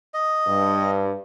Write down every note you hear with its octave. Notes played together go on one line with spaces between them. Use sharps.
D#5
G2